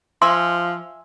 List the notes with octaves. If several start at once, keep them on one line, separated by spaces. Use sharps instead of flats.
F3 E5 G#5 C6